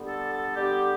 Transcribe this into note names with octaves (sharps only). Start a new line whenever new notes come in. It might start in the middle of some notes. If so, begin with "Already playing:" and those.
Already playing: D3 G3 B3
A4
A4
D3 G3 B3 G4